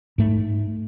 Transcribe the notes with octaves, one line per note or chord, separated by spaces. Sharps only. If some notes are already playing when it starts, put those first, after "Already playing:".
G#2 A3